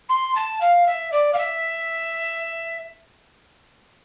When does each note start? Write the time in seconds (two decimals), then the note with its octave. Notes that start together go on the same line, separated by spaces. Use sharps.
0.09 C6
0.35 A5
0.60 F5
0.86 E5
1.12 D5
1.33 F5
1.37 E5